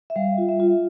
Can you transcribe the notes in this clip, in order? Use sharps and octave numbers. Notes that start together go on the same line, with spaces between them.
E5
G3 F5
F4
E5
F4